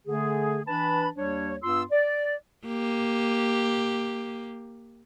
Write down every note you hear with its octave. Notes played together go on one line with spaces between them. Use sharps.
D3 A3 G#4
E3 D4 B4 A5 B5
D#2 G3 D4 C#5
G2 B3 F4 C6 E6
D5
A#3 G4